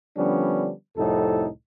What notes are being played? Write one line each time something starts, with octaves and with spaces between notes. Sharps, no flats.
D3 F3 G3 B3 C#4 D4
C2 F2 A2 D#4 A4